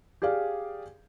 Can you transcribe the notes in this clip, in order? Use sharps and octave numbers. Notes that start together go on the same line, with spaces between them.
G4 G#4 D5 F5